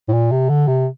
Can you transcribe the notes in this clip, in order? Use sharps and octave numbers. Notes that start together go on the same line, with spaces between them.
A2
A#2
C3
D3
C3